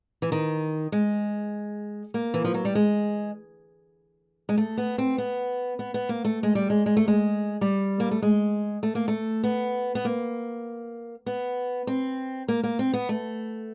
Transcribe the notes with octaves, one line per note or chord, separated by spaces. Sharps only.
E3
D#3
G#3
A#3
E3
F3
F#3
G3
G#3
G#3
A3
B3
C4
B3
B3
B3
A#3
A3
G#3
G3
G#3
G#3
A3
G#3
G3
A#3
A3
G#3
A3
A#3
A3
B3
B3
A#3
B3
C4
A#3
A#3
C4
B3
A3